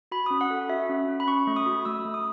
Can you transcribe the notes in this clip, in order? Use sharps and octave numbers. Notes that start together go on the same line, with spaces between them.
F#4 B5
C#4 D#6
F#5
A4
F#4 E5
C#4
C#4
B5
C#4 C#6
A3
D#6
F#4
A3 E6
A3
D#6